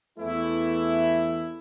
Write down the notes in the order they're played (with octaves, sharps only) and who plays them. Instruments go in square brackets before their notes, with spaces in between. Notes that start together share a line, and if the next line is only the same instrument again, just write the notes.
[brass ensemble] E2 E3 A3 E4